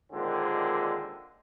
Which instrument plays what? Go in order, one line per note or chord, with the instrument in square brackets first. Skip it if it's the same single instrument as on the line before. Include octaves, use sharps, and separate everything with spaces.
[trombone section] D#2 A#2 D3 G#3 C4